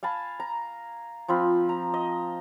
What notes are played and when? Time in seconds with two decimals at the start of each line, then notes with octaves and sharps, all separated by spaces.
0.03 F5 G#5 A5 B5
0.40 A#5
1.28 F3 C4 F4 B5
1.69 A#5
1.94 D#5